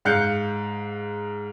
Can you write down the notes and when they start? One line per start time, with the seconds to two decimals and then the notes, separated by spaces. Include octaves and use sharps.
0.05 G#2 F5 F#6 G6 C#7